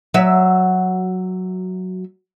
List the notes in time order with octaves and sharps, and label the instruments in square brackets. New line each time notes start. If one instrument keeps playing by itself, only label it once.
[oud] F#3 E5